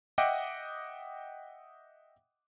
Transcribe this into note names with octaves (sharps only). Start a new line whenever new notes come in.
D#5 E5 F#5 G5 D6 D#6